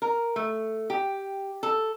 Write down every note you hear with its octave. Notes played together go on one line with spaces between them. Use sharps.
A#4
A3
G4
A4